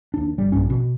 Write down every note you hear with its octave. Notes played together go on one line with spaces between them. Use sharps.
D#2 D4
G1 G3
A#1 G2 C#4
B2